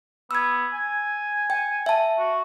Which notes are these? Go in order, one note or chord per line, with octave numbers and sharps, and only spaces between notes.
B3 E6 G#6
G#5
G5
E5 A5
F#4